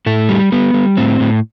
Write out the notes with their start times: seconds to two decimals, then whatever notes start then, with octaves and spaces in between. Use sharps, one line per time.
0.06 A2 A3
0.29 G3
0.52 G3 B3
0.74 G3
0.97 A2 C4
1.20 A2